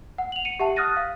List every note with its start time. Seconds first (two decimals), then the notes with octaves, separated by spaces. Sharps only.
0.18 F#5
0.32 F7 F#7
0.45 C#7 D#7
0.59 G4 E5 F#5 A5
0.76 D#6 F6 F#6 A6 A#6 D#7
0.97 F5